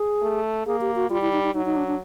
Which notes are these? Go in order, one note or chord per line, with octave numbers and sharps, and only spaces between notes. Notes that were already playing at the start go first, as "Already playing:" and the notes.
Already playing: G#4
A3
A#3 G#4
G4
F#4
G3 F4
E4
D#4
D#4
F#3 D#4
D#4
D4
D4